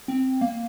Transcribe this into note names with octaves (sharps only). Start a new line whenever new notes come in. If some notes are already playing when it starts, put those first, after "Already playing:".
C4
A#3